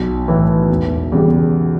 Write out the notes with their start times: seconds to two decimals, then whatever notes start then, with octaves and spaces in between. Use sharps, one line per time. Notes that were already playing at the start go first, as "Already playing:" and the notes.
Already playing: B1
0.28 A2 E3
0.70 E1
1.12 E2 C#3 G3